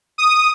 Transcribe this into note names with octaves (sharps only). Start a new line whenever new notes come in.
D#6